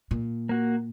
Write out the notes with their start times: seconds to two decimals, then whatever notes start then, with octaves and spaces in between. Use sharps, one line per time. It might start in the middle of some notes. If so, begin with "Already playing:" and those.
0.11 A#2
0.49 A#3 F#4